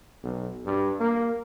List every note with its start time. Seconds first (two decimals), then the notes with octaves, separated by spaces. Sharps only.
0.23 B1
0.66 G2
1.00 A#3